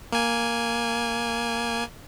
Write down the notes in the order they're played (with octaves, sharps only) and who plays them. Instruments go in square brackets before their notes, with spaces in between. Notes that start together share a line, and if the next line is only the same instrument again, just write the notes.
[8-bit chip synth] A#3 G#5